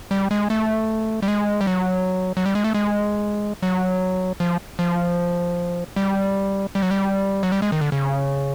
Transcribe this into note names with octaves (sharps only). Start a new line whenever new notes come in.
G3
G#3
A3
G3
G#3
G3
F#3
F#3
G3
G#3
A3
G#3
F#3
F3
F3
G3
G3
F#3
G3
F#3
G3
G#3
D#3
D3
C#3